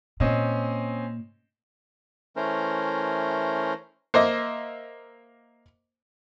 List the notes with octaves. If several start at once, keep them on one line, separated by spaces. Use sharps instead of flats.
A#2 C4 C#4 D#5
E3 A3 C#4 A#4 C5
A#3 C5 D#5 E5